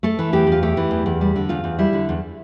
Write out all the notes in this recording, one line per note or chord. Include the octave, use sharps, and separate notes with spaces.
A3 A4
E3
E2 G4
E2
F4
A3 G4
E3
E2
E2
G3
D3
E2 F4
E2
G3 E4
D3
E2